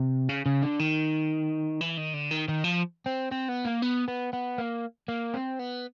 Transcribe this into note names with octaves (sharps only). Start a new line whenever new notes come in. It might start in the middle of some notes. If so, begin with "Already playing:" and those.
Already playing: C3
C#3
C#3
D3
D#3
E3
D#3
D3
D#3
D#3
F3
C4
C4
B3
A#3
B3
B3
B3
A#3
A#3
C4
B3